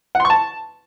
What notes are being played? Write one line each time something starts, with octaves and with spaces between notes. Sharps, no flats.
F#5
C6
C#6
A5